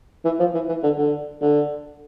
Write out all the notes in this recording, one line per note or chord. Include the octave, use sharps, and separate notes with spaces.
E3
F3
E3
E3
D3
D3
D3